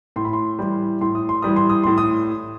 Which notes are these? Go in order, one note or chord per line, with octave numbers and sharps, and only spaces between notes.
A2 C6
B5
C6
E3 G3
A2 C6
D#6
C6
E3 G3 D#6
C6
D#6
A2 C6
D#6